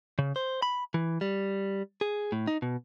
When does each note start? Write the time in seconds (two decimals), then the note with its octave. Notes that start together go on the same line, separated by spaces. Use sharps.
0.19 C#3
0.36 C5
0.62 B5
0.94 E3
1.21 G3
2.01 G#4
2.32 A2
2.47 D#4
2.62 B2